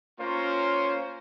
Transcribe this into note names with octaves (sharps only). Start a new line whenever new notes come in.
A#3 C#4 F4 A#4 C5 C#5